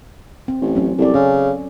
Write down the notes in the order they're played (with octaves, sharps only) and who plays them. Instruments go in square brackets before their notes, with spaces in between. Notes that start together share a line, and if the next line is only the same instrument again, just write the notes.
[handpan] C4
[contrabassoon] A1
[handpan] F#3 C4 C#4
[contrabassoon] C2 [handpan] A4 D5
[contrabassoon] C#3 [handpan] C#4